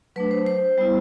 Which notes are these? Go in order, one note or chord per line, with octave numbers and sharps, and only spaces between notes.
F#3 A3 D4 B4
C5
C5
G3 B3 E4